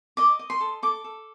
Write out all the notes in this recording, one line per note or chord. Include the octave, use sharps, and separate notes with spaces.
D#5 D6
D#5
C6
A4
A4 D6
A4